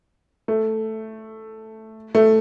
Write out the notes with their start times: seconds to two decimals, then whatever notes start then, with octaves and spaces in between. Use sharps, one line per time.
0.48 A3
2.15 A3